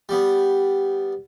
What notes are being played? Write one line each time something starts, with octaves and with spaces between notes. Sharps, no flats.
G3 B3